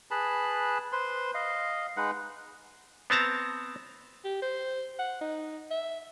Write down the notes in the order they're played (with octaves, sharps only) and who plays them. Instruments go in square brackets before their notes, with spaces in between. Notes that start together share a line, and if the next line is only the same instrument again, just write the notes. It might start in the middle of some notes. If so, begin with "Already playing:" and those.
[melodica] G#4 B4 A5 B5
B4 C5 C6
D#5 F5
G#3 D#4 B4 F#5
[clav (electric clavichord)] B3 C4 A5 A#5
[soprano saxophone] G4
C5
F#5
D#4
E5